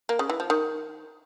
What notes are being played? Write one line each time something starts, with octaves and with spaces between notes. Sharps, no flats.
A#3
C#3
E3
F3
D#3